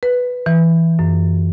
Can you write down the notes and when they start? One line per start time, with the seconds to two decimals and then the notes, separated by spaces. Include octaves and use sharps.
0.03 B4
0.46 E3
0.99 F#2